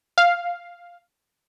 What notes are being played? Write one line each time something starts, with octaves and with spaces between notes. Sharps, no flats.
F5